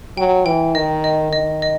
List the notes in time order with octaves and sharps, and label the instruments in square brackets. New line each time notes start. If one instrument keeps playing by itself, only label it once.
[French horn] F#3 [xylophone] G5
[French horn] E3 [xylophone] G5
[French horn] D#3 [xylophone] D#5
[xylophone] D#5
[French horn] D#3 [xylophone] D#5
[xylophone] D#5